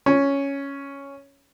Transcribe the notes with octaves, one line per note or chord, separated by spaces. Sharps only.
C#4